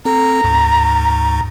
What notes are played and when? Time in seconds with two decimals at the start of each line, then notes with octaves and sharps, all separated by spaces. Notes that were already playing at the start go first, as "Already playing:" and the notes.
0.05 C4 A4 A#5
0.44 D2 G#2